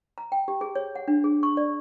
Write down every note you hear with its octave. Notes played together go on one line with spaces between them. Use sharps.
A#5
G5
G4
G#4
C#5
F#5
D4
G#4
C#6
D5